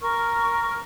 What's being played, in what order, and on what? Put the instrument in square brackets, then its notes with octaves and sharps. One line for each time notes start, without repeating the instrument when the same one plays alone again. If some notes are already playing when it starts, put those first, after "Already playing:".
[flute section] A#4 C#6 F6